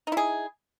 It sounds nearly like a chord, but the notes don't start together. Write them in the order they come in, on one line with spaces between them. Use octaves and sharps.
D#4 E4 G#4